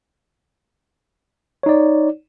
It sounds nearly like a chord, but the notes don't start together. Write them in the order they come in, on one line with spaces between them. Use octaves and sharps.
C#5 D#4 D5